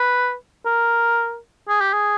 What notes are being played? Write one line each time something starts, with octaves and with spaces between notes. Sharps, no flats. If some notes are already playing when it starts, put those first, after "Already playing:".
Already playing: B4
A#4
G#4
G4
G#4